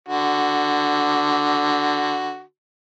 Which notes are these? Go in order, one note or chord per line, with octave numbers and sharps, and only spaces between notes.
D3 F#4